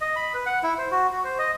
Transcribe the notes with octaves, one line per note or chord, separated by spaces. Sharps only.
D#5
B5
B4
F#5
E4
C5
F#4
F#4
C5
D#5